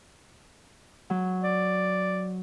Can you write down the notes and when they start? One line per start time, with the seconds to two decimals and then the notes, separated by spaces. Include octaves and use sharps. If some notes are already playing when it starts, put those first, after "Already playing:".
1.10 F#3
1.43 D5